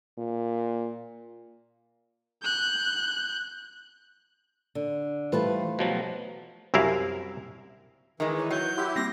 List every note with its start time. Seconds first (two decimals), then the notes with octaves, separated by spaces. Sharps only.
0.18 A#2
2.43 F#6 G6
4.75 D3
5.33 E3 G3 A3 F4 B4 C5
5.79 B2 F3 F#3 G4
6.74 C2 F#2 E4 A#4 F5
8.20 D#3 E3 G#3
8.38 C#5
8.51 F#3 D#4 C#5 G6
8.77 E4 G4 F#5 C6 E6
8.96 G3 A#3 C4 A#6